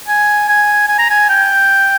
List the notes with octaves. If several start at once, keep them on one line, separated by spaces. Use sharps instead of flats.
G#5
G#5
G#5
A#5
G#5
G5